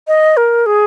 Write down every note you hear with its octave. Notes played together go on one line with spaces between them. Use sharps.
D#5
A#4
G#4